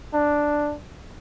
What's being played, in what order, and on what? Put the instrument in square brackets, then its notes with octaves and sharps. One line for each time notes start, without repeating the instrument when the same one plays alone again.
[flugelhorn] D4